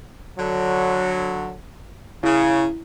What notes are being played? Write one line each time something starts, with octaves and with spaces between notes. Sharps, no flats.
D3 F#3
C#3 E4